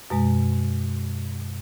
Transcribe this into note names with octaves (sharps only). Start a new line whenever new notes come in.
F#2 B2 G#3